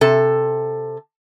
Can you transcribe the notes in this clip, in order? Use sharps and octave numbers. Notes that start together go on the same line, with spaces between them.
C3 A4